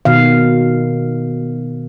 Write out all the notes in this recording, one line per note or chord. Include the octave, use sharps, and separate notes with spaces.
B2 D#3 F5